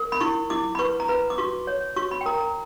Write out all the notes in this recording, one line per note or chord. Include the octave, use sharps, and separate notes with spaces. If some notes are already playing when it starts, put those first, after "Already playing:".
Already playing: A#4
B5
E4 C#6
E4 D6
B5
B4 C#6
A#5
B4 B5
D6
F#4 C#6
C#5
F#4 C#6
B5
G5
A#4 A#5
A#5